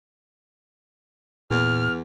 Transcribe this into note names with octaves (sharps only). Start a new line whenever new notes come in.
E2 A#2 F6